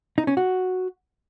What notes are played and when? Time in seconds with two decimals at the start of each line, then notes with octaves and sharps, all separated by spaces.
0.18 D#4
0.27 C#4
0.37 F#4